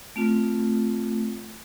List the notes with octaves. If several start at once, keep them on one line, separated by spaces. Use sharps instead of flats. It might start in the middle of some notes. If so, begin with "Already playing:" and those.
A3 C4 F4